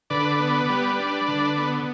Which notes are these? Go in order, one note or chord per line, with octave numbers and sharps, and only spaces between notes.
D3 B4 D5
B3
G3
D4
D3
B3